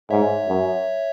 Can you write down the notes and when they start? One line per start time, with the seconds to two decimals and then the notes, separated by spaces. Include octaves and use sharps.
0.10 G#2 C#5 E5
0.49 F#2